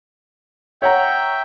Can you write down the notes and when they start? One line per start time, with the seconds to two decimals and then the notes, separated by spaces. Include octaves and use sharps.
0.82 C#5 E5 F#5 G5 A#5